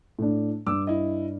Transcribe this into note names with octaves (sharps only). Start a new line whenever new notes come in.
A2 D4
G2 D6 E6
E4 D#5